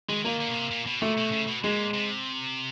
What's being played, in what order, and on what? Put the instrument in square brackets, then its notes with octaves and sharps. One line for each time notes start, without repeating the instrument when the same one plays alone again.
[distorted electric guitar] D#3 [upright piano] G#3
[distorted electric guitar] D#3 [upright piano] A#3
[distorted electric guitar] D3
B2
C3
A#2
B2
[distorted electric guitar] A#2 [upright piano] A3
[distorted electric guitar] B2
C#3
B2
[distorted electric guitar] A#2 [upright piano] G#3
[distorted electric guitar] C3